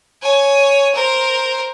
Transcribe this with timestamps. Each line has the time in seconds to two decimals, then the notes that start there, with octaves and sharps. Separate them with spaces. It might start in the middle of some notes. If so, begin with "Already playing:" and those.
0.22 C#5 G#5
0.95 A#4 C5